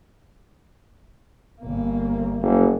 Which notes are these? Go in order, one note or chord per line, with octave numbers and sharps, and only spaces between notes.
G1 A#3
F#1